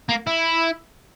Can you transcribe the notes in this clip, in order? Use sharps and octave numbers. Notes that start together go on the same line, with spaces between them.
A#3
E4